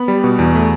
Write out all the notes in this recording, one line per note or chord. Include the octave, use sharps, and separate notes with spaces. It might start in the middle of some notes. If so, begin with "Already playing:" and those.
Already playing: B3 B5
G3
B2
E2
A3